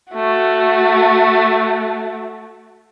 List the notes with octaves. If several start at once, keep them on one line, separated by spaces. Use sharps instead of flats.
A3 F#4